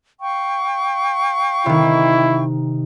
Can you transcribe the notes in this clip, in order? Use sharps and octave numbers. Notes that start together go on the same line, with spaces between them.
F5 G5 C#6
C3 D#3 E4